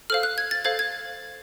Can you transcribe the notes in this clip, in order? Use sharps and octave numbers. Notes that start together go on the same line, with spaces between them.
A4 C5 F5 F6
F#6
G#6
A6
A4 C5 F5 G#6
G#6